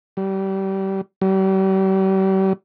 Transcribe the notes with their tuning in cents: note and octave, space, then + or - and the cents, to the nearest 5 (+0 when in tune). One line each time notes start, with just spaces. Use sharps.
G3 -25
G3 -40